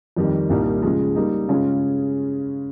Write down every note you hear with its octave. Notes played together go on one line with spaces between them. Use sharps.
F2 D#3 G3
C2 A#2 G3 A#3 D#4
C#3 F3 G#3
G3 A#3 D#4
C#3 G#3 C#4 F4